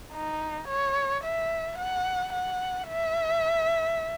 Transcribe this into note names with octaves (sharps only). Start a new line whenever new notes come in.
D#4
C#5
E5
F#5
F#5
E5